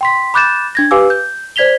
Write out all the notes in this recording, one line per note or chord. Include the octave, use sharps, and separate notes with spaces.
G5 C6 B6
B5 D6 F#6 G6 A6 E7
D4 G#6 A#6
G4 B4 F5 G#5 D6 E6
G6
C5 D5 G#6 B6 F7 G7